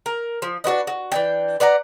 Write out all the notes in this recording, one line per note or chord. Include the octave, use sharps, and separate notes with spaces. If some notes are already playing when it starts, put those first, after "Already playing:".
A#4
F3
D4 F#4 B4 D#5
F#4
E3 D4 G5
B4 D5 F#5 A#5